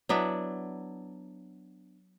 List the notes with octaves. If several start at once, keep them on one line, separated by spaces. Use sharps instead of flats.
F#3 B3 D4 E4